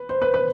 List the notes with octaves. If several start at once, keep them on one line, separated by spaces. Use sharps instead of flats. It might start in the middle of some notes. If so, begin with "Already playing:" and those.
Already playing: B4
C5
B4
B4